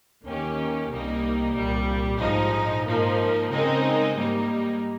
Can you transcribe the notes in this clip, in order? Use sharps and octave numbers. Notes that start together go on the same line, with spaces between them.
D#2 D#3 A#3 C#4 G4
C2 C3 G3 A#3 D#4
C2 A#2 G3
A#1 G#2 F3 G#3 D#4
G#2 F3 A#3 D#4 A#4
C#3 G#3 C4 D#4 A#4
G#2 G3 A#3 D#4